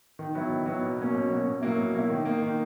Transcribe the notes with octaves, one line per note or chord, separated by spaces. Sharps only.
D#3
F#3 B3 E4
D#3
F#3 B3 E4
B2
F#3 A#3 C#4
B2
F#3 A#3 C#4
B2
F#3 A#3 E4
B2
F#3 A#3 E4
D#3
A#3 D#4
D#3